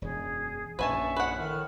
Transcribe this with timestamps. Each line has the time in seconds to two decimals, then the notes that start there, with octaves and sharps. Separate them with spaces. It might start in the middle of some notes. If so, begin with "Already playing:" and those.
0.02 E1 F#2 G#4
0.79 A#1 F#2 C#4 B4 E5 G#5 A5 C#6
1.17 B4 F#5
1.37 A2 D#3 F6